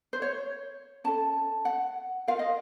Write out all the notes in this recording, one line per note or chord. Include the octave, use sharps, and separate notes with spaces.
C5
C#5
C#4 A4 A5
F#5
F4 A#4 F5
D#5